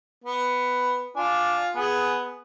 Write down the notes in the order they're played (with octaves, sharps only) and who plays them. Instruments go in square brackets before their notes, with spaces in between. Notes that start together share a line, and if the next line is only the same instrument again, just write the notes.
[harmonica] B3
[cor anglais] D4 [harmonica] F4 G#5
[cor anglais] B3 [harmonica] G#4 G#5